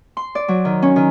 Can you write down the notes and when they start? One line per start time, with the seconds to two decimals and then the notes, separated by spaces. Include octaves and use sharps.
0.17 C6
0.35 D5
0.48 F#3
0.65 D#3
0.82 C#4
0.96 D#3